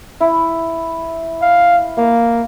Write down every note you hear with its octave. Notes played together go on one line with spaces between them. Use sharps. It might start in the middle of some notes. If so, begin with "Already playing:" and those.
E4
F5
A#3 F5